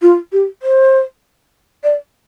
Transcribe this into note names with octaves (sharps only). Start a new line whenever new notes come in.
F4
G4
C5
D5